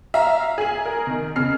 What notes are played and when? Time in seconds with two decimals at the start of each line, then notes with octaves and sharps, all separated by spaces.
0.14 E5 F5 A#5
0.58 G#4 G#5
0.85 A#4
1.07 D#3
1.36 C#3 F6 C7